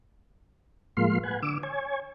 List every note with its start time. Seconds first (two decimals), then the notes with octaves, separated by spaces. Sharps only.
0.97 A2 F3 G#3 A#3 F5 C6
1.23 B4 F#5 G#5
1.42 D3 D6 E6
1.63 C#5 G#5